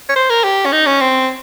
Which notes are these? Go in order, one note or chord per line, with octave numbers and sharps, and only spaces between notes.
C#5
C5
A#4
G4
C#4
D#4
C#4
C4